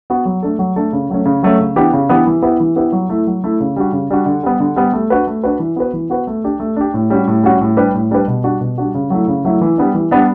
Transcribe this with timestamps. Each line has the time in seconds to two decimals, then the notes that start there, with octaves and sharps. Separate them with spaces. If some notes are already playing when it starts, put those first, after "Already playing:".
0.10 B3 F#4
0.25 F#3
0.43 A3 D4 A4
0.59 F#3
0.76 A3 D4 A4
0.93 C#3
1.10 F#3 A3 C#4
1.25 C#3
1.43 F#3 A3 C#4
1.60 C#3
1.76 E3 B3 D4 G4
1.93 C#3
2.09 E3 B3 D4 G4
2.27 E3
2.42 B3 E4 G4 B4
2.60 E3
2.76 B3 E4 G4 B4
2.92 F#3
3.09 A3 E4
3.27 F#3
3.44 A3 E4
3.60 C#3
3.76 G3 D4 F#4
3.93 C#3
4.10 G3 D4 F#4
4.26 D3
4.43 G3 B3
4.60 D3
4.76 G3 B3
4.93 A3
5.10 D4 F#4 B4
5.27 A3
5.44 D4 F#4 B4
5.59 E3
5.76 B3 F#4 B4
5.93 E3
6.10 B3 F#4 B4
6.27 A3
6.44 D4 G4
6.60 A3
6.76 D4 G4
6.94 A2
7.10 G3 C#4 F#4
7.27 A2
7.44 G3 C#4 F#4
7.61 A2
7.77 G3 D4 G4 B4
7.94 A2
8.11 G3 D4 G4 B4
8.28 B2
8.44 G3 D4 F#4
8.61 B2
8.78 G3 D4 F#4
8.94 C#3
9.10 F#3 A3 E4
9.28 C#3
9.45 F#3 A3 E4
9.61 E3
9.78 G3 B3 D4
9.94 E3
10.11 G3 B3 D4